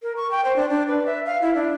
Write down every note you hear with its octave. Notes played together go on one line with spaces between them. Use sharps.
A#4
C#6
G5
C5
D4
D4
B4
E5
F5
E4
D4